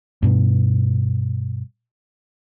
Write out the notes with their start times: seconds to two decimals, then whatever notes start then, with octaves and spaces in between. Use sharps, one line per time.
0.22 G2 B2